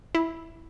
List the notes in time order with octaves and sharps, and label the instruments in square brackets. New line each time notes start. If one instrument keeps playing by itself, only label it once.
[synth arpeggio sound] E4